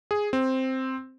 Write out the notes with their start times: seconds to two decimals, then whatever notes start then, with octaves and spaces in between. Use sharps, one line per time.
0.11 G#4
0.33 C4